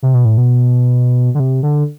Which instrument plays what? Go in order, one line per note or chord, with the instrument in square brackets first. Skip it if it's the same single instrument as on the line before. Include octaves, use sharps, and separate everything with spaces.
[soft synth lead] C3
B2
A2
B2
D3
C3
D3